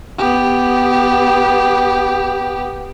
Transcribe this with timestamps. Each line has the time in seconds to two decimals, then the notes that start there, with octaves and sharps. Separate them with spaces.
0.18 B3 G4